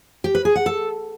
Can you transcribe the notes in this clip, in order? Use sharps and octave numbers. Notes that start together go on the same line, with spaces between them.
G4
B4
G#4
F#5
A4